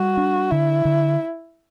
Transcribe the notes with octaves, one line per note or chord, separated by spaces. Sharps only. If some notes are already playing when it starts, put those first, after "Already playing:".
Already playing: G3 F#4
D4
D3 E4
D3